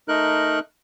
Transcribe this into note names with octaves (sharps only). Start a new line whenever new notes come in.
A3 D#4 A#4 F#6